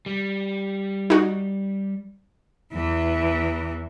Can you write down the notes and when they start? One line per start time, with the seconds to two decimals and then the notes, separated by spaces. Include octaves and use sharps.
0.06 G3
1.10 D#4 F#4
2.73 E2 E3